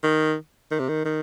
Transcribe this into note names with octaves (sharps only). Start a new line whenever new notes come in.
D#3
D#3
C3
D#3
D#3